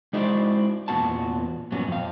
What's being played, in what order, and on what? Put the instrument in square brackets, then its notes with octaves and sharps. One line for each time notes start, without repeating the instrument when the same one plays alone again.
[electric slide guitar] G#3 D#4 E4 F#4 C5 D5
E2 A#2 E3 B3 F#4 A5
G2 A#2 F#3 G3 B3 C#4
F2 F5